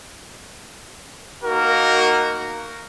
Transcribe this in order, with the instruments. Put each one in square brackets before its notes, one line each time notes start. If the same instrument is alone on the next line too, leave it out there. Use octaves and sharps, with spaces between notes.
[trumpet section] A#3 D#4 F#4 A#4